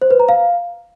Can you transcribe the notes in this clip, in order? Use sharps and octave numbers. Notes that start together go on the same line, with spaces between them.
C5
B4
A#5
F5